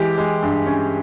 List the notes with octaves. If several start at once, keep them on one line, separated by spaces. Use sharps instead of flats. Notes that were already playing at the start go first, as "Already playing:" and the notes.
Already playing: E3 G#3 G4
G#3
G2
C#4